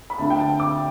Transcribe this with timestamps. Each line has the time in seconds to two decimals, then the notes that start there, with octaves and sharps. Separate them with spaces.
0.10 B5
0.18 D2 D3 A5
0.30 G5
0.39 A5
0.60 D6